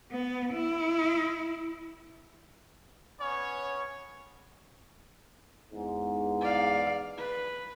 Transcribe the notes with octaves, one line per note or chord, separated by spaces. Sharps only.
B3
E4
B3 C#4 C#5
E2 G#2
D5 F5
B4